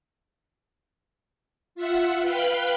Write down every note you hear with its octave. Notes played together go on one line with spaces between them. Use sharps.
F4 E5 F#5
B4 F5 G5 B5 F#6 G6